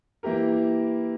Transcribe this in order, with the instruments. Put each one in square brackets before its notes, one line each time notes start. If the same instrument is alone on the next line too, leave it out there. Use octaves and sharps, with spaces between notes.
[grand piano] E3 A#3 E4 G4 A#4